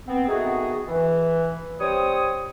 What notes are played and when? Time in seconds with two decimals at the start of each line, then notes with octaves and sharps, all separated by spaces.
0.07 B3 C4
0.26 D#3 A3 B3 F#4 G#4
0.87 E3
1.79 G3 C4 C#5 D#6